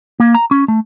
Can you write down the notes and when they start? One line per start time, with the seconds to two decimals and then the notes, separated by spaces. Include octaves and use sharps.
0.20 A#3
0.35 A#5
0.51 C#4
0.68 A3